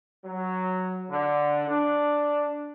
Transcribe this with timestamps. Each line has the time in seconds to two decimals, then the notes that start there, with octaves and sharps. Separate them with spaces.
0.25 F#3
1.10 D3
1.68 D4